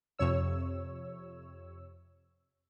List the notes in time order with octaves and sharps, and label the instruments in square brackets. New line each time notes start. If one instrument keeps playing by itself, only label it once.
[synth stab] F2 C3 C#5 E6